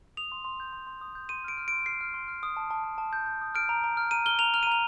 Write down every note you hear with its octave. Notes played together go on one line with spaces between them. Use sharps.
D#6 F7
C6
C6
G6
C6
C6
D#6
G6
C6 D#7
F6 D7
F6
C6 D7
F6 C7
F6
C6
F6
D#6
A5
A5
A5
A5
G6
G6
D#6
F6 D7
A#5
A#5
F6
A#5 D#7
F6 G7
A#5 F7
F6 F7
D#7
A#5 F7